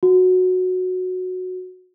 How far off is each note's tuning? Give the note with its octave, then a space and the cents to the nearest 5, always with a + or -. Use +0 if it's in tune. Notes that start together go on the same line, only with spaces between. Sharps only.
F#4 -10